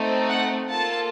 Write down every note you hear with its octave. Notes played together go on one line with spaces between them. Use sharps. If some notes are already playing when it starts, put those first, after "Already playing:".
Already playing: A3 C4 D#4
F#5
A#3 F4 A4 A5